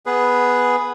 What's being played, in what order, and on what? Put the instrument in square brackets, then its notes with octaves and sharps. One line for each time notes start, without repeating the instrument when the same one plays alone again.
[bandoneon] B3 G#4 B4